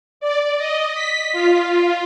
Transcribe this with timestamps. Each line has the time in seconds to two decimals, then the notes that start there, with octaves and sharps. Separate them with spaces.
0.20 D5
0.58 D#5
0.94 B6
1.32 F4